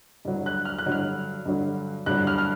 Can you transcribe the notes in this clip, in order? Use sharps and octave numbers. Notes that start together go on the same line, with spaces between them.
G2 D3 F#3
F#6
F6
F#6
G2 D3 F#3
F6
G2 D3 F#3
G2 D3 F#3 F#6
F6
F6